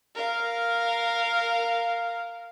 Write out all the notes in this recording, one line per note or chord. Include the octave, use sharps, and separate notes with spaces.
A#4 F5